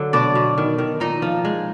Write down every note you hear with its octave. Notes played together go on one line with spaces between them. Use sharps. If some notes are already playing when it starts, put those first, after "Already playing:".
Already playing: D3 F#3
B2 D4 D5
B2
D#3
D#3
A#2 D#4 D#5
F3
G#3